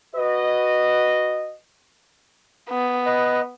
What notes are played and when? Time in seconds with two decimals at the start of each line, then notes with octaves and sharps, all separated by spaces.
0.15 F#4 B4 D#5
2.70 B3
3.06 B4 D#5